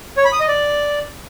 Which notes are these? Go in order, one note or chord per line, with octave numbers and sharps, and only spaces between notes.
C#5
B5
D#6
D#5
D5